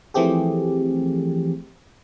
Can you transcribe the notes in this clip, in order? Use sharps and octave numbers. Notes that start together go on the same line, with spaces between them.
E3 F3 A3 C4 G4 G#4